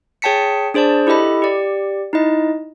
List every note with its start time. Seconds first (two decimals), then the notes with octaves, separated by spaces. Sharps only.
0.22 G#4 C#5 G5 A5 B6 C#7
0.74 D4 G#4 C5 D5 A5
1.07 E4 G4 A4 D#5 B5
1.42 G4 D5
2.13 D#4 E4 D#5